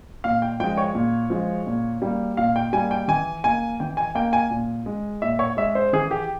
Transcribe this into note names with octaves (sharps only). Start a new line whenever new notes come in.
A#2 F5
G5
F3 G#3 G5
C#5
A#2
F3 G#3
A#2
G3 A#3
A#2 F5
G5
G3 A#3 G#5
G5
E3 G#5
A#3 G#5
E3 G5
G#5
A#3 G5
G#5
A#2
G#3
A#2 E5
C#5
G#3 E5
C5
E3 G#4
G4